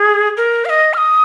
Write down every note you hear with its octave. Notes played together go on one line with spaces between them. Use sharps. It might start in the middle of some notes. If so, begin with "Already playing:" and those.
Already playing: G#4
A#4
F5
D#5
F6
D#6